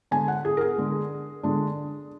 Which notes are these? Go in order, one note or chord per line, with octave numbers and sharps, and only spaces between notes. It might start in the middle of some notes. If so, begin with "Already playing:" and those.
D3 G#3 D4 G#5
F#5
G#4
A#4
G#4
D3 G#3 D4
D3 G#3 D4